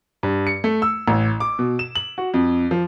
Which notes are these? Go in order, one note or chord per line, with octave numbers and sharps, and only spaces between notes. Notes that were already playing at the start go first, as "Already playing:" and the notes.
G2
C#7
A3
E6
A1
D6
B2
E7
F#7
F#4
F2
F3